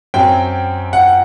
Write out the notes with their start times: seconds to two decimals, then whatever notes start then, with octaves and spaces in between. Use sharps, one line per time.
0.14 F#2 F#3 C4 G5
0.93 F#5